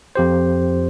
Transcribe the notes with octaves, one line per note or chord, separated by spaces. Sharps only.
F2 G4 C5